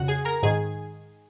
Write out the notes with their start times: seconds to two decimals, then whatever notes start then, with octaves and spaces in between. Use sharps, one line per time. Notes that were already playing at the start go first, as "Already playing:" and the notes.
Already playing: F2 C#3 F#4 F#5
0.08 G#4 G#5
0.25 A#4 A#5
0.43 G#2 D#3 G#4 G#5